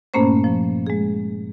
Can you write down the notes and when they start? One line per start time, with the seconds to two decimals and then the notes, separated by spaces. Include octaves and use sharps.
0.14 G2 A#2 A3 A#3 C#4 C5
0.44 F3
0.87 G#3 G#4